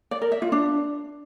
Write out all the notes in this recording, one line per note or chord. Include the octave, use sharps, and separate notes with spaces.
D5
A#4
E5
F4
D4